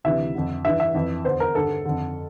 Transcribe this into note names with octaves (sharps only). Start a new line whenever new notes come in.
D2 C3 E3 E5
F2 D3
G2 E3 E5
E5
F2 E3
E2 D3 C5
A#4
G2 D3 A4
F2 D3